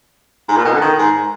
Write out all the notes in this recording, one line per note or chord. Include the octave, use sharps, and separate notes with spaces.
G#2
A#2
B2
D3
D#3
G#2